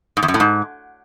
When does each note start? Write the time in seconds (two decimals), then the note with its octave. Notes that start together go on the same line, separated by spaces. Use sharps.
0.17 G#2
0.23 E2
0.28 F#2
0.34 A2
0.40 G#2